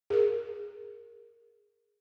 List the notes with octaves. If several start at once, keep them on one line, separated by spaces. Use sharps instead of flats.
G#4 A#4